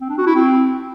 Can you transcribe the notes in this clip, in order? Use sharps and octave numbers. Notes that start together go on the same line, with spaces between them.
C4
D4
F#4
E4
C4